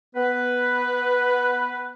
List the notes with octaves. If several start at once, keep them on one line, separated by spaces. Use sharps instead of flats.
B3 B4